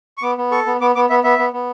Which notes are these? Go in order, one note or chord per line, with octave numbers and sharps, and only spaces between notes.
C#6
B3 D6
B3
A4 C#6
B3
B3 D6
B3 D6
B3 E5
B3 E5
B3
B3